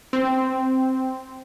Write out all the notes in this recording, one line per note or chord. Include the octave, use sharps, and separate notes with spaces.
C4